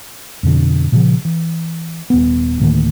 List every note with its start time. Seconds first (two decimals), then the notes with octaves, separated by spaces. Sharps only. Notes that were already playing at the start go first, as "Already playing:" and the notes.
0.43 F2 B2 D3
0.92 A#2 C#3 F3
1.25 E3
2.10 D#1 B3
2.60 D2 A2 D#3 A#3